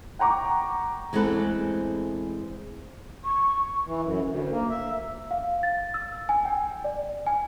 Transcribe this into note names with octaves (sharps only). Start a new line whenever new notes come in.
F#5 G5 A#5 C#6 D6
E2 G#3 A3 C4 A4 B4
C#6
E3
F#2
D2
A#3
E5
F5
A6
E6
G#5
G5
D5
G#5